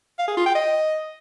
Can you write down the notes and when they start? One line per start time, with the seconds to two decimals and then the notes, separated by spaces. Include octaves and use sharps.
0.19 F5
0.28 G#4
0.37 F4
0.46 G5
0.55 D#5